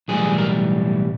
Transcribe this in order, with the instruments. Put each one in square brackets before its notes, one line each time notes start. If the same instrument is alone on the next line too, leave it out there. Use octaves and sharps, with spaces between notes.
[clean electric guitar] B1 A2 E3 G3 G#4
A#4